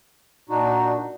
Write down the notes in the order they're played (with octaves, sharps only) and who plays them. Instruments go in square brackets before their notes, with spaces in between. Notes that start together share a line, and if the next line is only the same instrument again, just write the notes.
[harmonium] A#2 D4 D#4 F#4